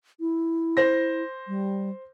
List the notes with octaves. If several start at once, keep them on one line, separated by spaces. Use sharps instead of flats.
E4
C5 A#6
G3